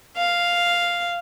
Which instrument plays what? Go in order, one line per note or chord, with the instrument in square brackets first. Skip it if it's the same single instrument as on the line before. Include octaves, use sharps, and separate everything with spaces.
[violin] F5